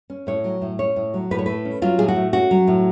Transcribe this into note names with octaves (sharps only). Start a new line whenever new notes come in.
C#4
A2 C#5
F#3
A2
C#4 C#5
A2
F#3
A2 B4
C#5
A3 B4
C#4
F#3 F4
A2 G#4
F#4
A3
C#4 F#4
F#3
A2